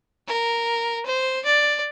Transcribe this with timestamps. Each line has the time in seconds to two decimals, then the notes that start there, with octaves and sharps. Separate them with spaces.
0.28 A#4
1.06 C5
1.45 D5